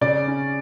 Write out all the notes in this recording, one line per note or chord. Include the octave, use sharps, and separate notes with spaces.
C#3 D5
C#4